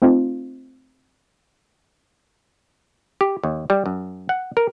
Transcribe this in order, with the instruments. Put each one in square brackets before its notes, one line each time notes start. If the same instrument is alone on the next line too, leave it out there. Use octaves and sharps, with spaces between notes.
[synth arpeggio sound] A3 C4 D#4 F4
[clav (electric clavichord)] G4
D#2
G3
F#2
F#5
A#4